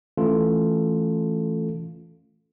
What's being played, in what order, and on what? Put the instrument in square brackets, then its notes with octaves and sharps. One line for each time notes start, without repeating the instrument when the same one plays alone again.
[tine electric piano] E3 A3 C#4 F4 A4